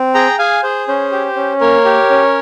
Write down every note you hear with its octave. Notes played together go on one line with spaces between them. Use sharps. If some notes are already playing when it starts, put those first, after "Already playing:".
Already playing: C4
G#4 G5 A#5
G#4 F5 G#5
G#4 C5
C#4 C5
G4
C#4
A#3 A#4 C#5
G4
C#4